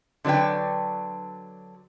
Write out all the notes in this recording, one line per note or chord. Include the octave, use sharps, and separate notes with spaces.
D3 F#3 D4 B4 G5